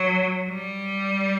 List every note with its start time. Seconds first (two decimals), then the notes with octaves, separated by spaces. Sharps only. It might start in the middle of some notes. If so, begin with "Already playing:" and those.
Already playing: F#3
0.50 G3